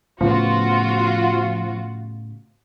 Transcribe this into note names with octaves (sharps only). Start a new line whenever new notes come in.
A2 C#3 F3 B3 F4 F#4